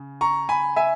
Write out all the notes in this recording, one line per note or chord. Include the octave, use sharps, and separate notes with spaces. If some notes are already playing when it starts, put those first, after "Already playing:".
Already playing: C#3
A#5 C#6
G#5 B5
E5 G#5